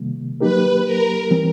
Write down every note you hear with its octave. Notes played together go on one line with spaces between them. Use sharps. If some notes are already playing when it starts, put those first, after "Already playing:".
Already playing: C3 D#3 G3 A#3
F#3 A#3 D#4 G4 A#4 B4
A#4
E3 G3 C4